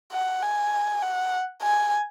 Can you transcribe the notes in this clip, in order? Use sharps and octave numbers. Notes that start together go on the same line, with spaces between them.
F#5
G#5
F#5
G#5